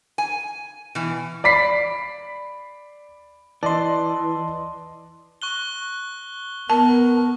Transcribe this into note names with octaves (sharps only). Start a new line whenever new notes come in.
G#5
B2 E3
D5 B5 B6 C7
E3 D5 D#5 A5 C6
C#6 F#6 G7
B3 A#4 A5 C#6